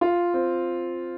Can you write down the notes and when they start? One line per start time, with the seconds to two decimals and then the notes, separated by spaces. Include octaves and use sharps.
0.01 F4
0.34 C4